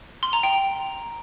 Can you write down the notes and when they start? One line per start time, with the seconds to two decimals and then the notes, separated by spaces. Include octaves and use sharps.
0.23 C6
0.33 A#5
0.43 G5